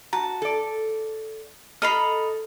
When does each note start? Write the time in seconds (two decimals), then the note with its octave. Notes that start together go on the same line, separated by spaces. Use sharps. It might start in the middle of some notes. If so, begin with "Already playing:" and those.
0.13 F#4 A5 A#5
0.42 A4 D5
1.82 A4 D#5 A#5 B5 F6 C7